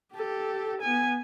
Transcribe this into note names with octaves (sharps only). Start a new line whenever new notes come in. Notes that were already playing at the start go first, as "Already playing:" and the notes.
G4 A4
B3 G#5